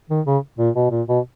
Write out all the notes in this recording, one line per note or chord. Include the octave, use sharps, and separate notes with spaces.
D#3
C#3
A#2
B2
A#2
B2